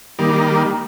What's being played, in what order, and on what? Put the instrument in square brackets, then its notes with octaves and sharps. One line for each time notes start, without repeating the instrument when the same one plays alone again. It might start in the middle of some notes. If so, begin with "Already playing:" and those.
[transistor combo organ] D#3 G3 A#3